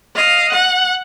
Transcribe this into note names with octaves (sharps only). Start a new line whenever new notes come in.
D#5 F5
F#5